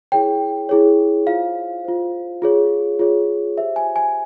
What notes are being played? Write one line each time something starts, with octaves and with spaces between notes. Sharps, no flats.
E4 G#4 C#5 G5
E4 G#4 C#5
F4 C5 F5
F4 C5
F4 G#4 C#5
F4 G#4 C#5
G4 C5 E5
G#5
G#5